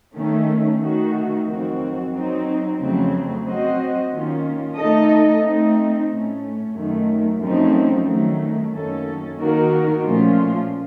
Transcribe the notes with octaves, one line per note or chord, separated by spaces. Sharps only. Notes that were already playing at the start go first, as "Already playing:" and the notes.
D#3 A3 C#4
D#3 A3 D#4 F#4
F2 D#3 F#3 C4 F#4
F#3 C4 D#4
F2 C#3 F#3 A3 C4
F#3 C4 F#4 C5 D#5
D#3 A#3 C#4 F4
A3 D#4 A4 D#5
A3 C4 D#4
A2 A3 C#4
F#2 D#3 A3
F#2 F3 A3 C4 D#4
D#3 F#3 A3
F#2 D#3 A#3 C#4 A4
D#3 A#3 D#4 F#4 A#4
A#2 F3 A3 C#4 F4